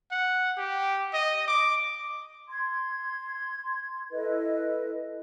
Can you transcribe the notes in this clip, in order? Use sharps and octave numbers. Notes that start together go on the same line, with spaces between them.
F#5
G4
D#5
D6
C6 G#6
E4 A4 B4 D#5